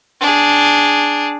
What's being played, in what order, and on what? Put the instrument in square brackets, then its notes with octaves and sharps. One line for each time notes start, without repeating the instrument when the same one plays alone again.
[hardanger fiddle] D4 G#4